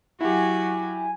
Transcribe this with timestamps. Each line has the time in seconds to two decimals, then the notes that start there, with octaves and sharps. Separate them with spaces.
0.21 F#3 E4 F#4 G4 G#5